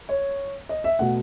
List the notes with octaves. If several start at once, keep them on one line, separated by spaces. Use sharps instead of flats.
C#5
D#5
E5
B2 A3 F#5